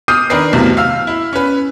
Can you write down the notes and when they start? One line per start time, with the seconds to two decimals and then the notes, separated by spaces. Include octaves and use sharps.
0.08 D6 D#6 F6 G6 C7 D#7
0.30 D#3 D4 A#4 B4 C7
0.53 B1 E2 A2 C3
0.77 F5 E6 F6
1.07 E4
1.33 C#4 B4